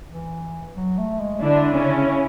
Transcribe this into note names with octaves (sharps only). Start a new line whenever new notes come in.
E3
F#3
A3
G#3
D3 D4 E4
C#3 C#4